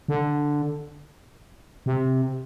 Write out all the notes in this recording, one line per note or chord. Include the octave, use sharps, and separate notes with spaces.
D3
C3